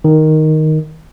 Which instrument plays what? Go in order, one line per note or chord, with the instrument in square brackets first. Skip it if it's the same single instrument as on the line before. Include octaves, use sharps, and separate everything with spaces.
[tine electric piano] D#3